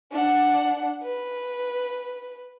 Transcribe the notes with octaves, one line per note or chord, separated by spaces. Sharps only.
D4 F#5
B4